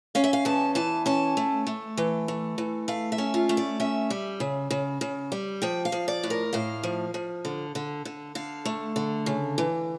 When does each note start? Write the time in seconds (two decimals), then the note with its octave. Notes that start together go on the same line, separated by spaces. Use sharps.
0.15 C#4 F5
0.24 E5
0.33 F5
0.45 E2 A5
0.75 E3 A5
1.06 C#4 A5
1.37 A3
1.67 A3
1.97 E3
2.28 A3
2.58 E3
2.88 A3 F5
3.12 E5
3.18 C#4
3.34 F4
3.49 A3
3.57 D5
3.80 C#4 E5
4.10 G3
4.40 C#3
4.70 C#3
5.01 C#3
5.32 G3
5.62 F3 G5
5.85 F5
5.92 F3
6.08 D5
6.23 A2
6.30 A#4
6.53 A2 F5
6.83 F3
7.14 F3
7.45 D3
7.75 D3
8.05 D3
8.35 D3 F5
8.65 A3
8.96 D3
9.26 C#3
9.58 E3